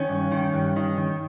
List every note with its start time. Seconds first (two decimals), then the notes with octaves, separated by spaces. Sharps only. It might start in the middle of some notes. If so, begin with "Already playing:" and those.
Already playing: D#3 C#4
0.09 G2
0.32 D#3
0.54 G2
0.76 D#3
0.98 D#3